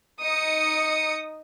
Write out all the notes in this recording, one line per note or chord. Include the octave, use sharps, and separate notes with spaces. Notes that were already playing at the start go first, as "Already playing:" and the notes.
D#4 D#6 C#7